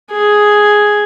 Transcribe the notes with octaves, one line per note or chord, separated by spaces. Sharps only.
G#4